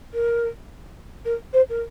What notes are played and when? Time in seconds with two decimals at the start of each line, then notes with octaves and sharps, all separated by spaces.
0.13 A#4
1.25 A#4
1.53 C5
1.69 A#4